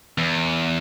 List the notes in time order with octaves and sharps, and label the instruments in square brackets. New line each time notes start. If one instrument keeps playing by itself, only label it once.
[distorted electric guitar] E2